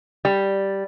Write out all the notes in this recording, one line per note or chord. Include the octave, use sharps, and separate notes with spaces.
G3